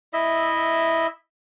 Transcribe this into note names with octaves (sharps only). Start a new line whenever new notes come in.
E4 D#5 E5